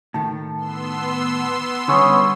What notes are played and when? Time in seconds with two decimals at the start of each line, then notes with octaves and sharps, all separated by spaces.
0.14 A2 D#3 A5
0.56 B3 C6 E6
1.88 D3 G3 B3 C#4 G#4 C6 C#6 E6